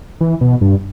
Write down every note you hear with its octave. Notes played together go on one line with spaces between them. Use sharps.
E3
B2
G2